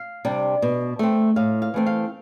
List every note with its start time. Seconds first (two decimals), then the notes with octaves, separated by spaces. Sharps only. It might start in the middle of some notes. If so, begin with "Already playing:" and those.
Already playing: F5
0.25 C3 G3 D4
0.62 B2
0.99 A3 C4
1.36 A2 F5
1.62 F5
1.74 E3 A3 C4
1.87 F5